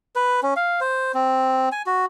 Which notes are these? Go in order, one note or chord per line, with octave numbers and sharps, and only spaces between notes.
B4
C#4
F5
C5
C4
G#5
F#4